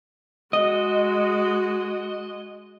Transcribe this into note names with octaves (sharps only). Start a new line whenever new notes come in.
G#3 F#4 D#5